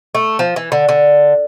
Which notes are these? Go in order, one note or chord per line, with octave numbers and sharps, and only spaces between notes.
A3
F3
E3
D3
D3